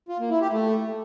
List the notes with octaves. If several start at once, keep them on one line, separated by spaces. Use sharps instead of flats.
F4
A#3
E4
G4
A3